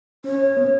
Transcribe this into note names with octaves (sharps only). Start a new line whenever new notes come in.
C#4 C#5
B3